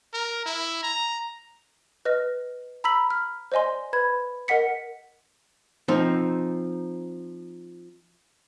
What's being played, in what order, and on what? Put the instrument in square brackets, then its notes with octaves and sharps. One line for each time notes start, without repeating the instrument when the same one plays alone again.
[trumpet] A#4
E4
A#5
[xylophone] B4 D#5 F6 A#6
A#5 B5 E6 B6 F#7
F6
C5 D5 D#5 G#5 C6
B4 B5 G#6
A#4 D#5 F#5 B6 C#7
[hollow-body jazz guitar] F3 C4 D#4